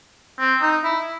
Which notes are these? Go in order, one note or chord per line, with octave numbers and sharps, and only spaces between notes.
C4
D#4
E4